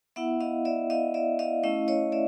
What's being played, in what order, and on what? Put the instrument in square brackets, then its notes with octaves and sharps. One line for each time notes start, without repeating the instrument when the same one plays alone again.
[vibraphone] B3 E4 E5 F#5
D#5 F5
D5 E5
D#5 F5
D5 E5
D#5 F5
A3 C#4 E4 D#5 F5
C#5 D#5
D5 E5